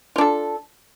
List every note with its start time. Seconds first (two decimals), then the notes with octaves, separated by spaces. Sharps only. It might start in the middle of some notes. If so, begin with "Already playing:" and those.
0.16 F4
0.18 D4
0.21 A4